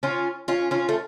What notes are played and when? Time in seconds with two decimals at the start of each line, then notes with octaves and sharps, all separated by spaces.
0.03 C#4 F4
0.48 C#4 F4
0.71 C#4 F4
0.89 A3